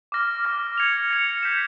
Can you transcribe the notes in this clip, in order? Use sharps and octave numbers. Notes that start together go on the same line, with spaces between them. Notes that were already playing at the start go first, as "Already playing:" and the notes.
D6 F6 A#6
D6 F6 A#6
G#6 C#7 F7
G#6 C#7 F7
G6 B6 E7